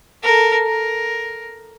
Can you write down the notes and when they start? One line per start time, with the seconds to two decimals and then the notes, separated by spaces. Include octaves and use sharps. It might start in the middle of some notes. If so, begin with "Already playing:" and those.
0.23 A4 A#4
0.66 A#4